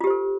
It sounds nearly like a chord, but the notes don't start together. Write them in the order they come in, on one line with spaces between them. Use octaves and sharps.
F4 G4 C5 A4